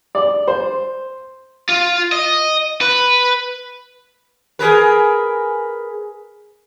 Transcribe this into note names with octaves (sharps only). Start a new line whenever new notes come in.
D5
C5
F4
D#5
B4
G#4 A#4 B4